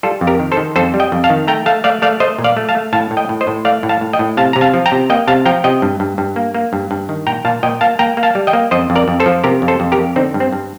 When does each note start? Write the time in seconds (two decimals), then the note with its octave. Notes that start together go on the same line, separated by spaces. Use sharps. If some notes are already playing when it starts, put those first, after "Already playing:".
0.03 G3 F4 A4
0.21 F2
0.27 G4 A#4
0.40 D#3
0.52 A4 C5
0.57 D#3
0.76 F2 A4 C5
0.94 G3
1.00 D#5 G5
1.12 F2
1.24 F5 A5
1.30 D#3
1.48 A3 G5 A#5
1.66 A3 F5 A5
1.84 A3 D5 F5
2.02 A3 D5 F5
2.20 A3 C5 D#5
2.39 A#2
2.44 D5 F5
2.57 A3
2.69 F5 A5
2.75 A3
2.93 A2 F5 A5
3.11 A2
3.17 D#5 G5
3.29 A2
3.41 C5 D#5
3.47 A2
3.65 A3 D5 F5
3.83 A2
3.89 F5 A5
4.01 A2
4.13 D#5 G5
4.19 A2
4.37 C3 F5 A5
4.53 C3 A#5
4.61 F5 A5
4.74 F3
4.86 G5 A#5
4.92 C3
5.10 A#3 D#5 G5
5.28 C3 F5 A5
5.45 F3 G5 A#5
5.64 C3 D#5 G5
5.82 G2
6.00 G2
6.18 G2
6.36 A#3
6.54 A#3
6.73 G2
6.91 G2
7.09 D#3
7.27 A#2 G5 A#5
7.45 A#2 F5 A5
7.63 A#2 D#5 G5
7.81 A#3 F5 A5
7.99 A#3 G5 A#5
8.17 A#3
8.23 F5 A5
8.35 G3
8.47 D#5 G5
8.53 A#3
8.71 F2 C5 D#5
8.90 F2
8.95 A#4 D5
9.08 F2
9.20 A4 C5
9.26 F3
9.44 C3 G4 A#4
9.62 F2
9.68 A4 C5
9.80 F2
9.92 G4 A#4
9.98 F2
10.16 D3 C4 D#4
10.34 G2
10.40 C4
10.53 G2